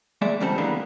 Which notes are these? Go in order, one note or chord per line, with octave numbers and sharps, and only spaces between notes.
G#3 A#3 D5 E5
E2 C#3 G3 C4 A4
E3 G3 G#3 A#3 B3 D4